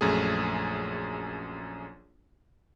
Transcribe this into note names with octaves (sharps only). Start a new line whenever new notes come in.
A#1 F#2 A3 G#4